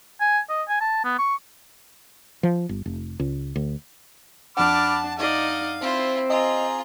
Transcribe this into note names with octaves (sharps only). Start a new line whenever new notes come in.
G#5
D#5
G#5
A5
B3
C#6
F3
G1
F1
C#2
D2
F2 D4 F#5 A5 B5 D6 F6
D#4 D5 D#5 F5
C4 E4 F4 C5
F4 G#4 D#5 A#5